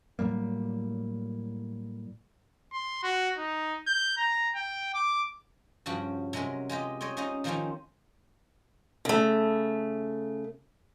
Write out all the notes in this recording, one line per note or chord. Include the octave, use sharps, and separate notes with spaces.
A2 F#3 G3 A#3
C6
F#4
D#4
G6
A#5
G5
D6
G2 C#3 F3 F#4 G5 B5
C3 F#3 G#3 C#4 A#4
G#3 F4 G4 D#5
C4 C5 C#5 D#5
C#4 D#4 F4 C5 D#5
D#3 F3 A#3 C4 C#4 F4
C#3 A3